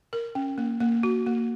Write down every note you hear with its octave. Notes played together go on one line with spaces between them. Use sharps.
A#4
C#4
A#3
A#3
F#4
A#3